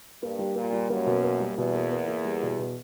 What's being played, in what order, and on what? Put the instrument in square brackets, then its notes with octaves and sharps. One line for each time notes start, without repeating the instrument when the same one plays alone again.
[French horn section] G2 [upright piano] A#3
[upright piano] G3
[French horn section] A#2 [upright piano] A#3
[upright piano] G3
[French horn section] F#2 [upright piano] A#3
[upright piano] B2
A#3
G3
[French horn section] E2 [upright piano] B2
[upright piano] A#3
A#3
A#3
G3
B2
B2